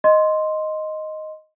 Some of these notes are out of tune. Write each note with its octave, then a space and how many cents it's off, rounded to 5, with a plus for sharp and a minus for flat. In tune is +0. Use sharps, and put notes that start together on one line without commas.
D#5 +0 C6 +0